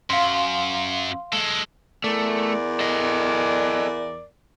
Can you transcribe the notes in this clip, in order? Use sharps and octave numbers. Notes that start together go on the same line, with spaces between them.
F#2 F5 C6
G#3 A4
E2 A3 A#4 D5
A4 D#5